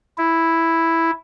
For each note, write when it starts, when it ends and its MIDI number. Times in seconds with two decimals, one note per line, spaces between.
0.18 1.11 64